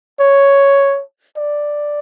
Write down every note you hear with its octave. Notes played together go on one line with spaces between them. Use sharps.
C#5
D5